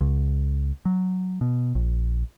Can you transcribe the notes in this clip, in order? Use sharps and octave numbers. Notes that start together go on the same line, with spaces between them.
C#2
F#3
B2
A#1